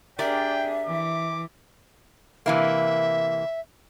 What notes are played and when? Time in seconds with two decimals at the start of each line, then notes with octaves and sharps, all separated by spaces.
0.19 D4 G4 G#4 A#4 D5 E5 G5
0.87 E3 D6
2.46 C3 E3 A#3 E5